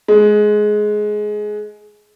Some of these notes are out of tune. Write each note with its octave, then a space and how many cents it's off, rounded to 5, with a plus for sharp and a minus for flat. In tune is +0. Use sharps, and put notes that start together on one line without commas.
G#3 +15